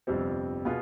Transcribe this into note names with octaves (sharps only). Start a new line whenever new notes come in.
G1 F2 C3 G3 C4
B2 B3 F4 G#4